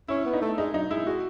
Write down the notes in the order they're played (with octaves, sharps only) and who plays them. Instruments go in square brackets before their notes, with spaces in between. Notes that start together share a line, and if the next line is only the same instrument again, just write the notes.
[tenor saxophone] C#4 [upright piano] E4
[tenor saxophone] B3
[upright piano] D#4
[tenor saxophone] A3
[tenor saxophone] G#3 [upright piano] D#4
[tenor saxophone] F#3 [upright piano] D#4
[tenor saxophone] G#3 [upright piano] E4
[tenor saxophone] G#3 [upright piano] F#4